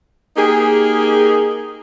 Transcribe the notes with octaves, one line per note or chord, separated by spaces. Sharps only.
A#3 D#4 G4 G#4